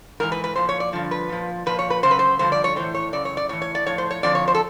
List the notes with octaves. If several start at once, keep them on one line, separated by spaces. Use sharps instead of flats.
G#2 E3 A#4
B4
B4
A#2 F3 C5
C#5
D5
G2 D3 F3
B4
A#2 F3
A#2 F3 B4
C#5
B4
F#2 C#3 C5
B4
C5
G2 D3 F3 C5
D5
C#5
A2 E3 C5
C#5
F#2 C#3 D5
C#5
D5
A2 E3 C#5
C#5
D5
A2 F3 C#5
C5
C#5
F2 D3 F3 D5
C#5
C5
A4